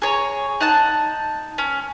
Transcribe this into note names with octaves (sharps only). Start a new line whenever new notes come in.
G#4 C#5 A#5
D#4 F#5 A5
C#4